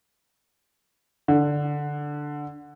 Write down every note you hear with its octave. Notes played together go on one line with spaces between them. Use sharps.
D3